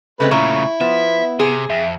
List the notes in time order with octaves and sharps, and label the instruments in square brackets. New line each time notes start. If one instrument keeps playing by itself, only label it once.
[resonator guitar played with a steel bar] C#3 G#3 C4 [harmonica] A3 B4
[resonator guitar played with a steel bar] A#2 C#4 [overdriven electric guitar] C#3 A3 [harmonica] E4 [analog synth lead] C#6
[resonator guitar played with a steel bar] F3 [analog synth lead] B3 [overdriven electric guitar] E5
[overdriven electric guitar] C3 [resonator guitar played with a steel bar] G#4
[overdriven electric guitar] F2 [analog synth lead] E5